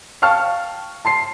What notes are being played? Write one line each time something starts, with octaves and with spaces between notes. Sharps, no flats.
F5 G5 A5 C#6 F6
A5 C6 C7